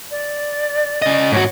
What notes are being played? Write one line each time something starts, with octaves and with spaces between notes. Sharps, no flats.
D5
C#3 D#5
G#2 F#4 C#5